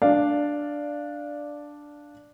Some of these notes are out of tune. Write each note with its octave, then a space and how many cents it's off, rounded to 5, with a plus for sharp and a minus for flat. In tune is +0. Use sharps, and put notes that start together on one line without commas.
D4 +0 D5 +0 F5 -5